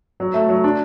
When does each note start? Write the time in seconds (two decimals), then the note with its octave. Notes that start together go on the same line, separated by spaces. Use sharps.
0.20 F#3
0.34 A3
0.49 F#3
0.64 D4